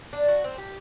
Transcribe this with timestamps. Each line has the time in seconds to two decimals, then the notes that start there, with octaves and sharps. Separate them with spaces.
0.13 D4
0.28 F#4
0.44 C4
0.58 G4